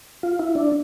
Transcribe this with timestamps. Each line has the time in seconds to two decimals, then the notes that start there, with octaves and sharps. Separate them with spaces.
0.23 F4
0.39 E4
0.55 D4